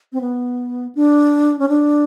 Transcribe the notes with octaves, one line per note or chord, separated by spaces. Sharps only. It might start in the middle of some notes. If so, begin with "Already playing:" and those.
C4
B3
D4
C#4
D4